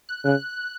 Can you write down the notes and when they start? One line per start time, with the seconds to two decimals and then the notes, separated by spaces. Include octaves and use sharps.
0.09 F#6
0.25 C#3 F#6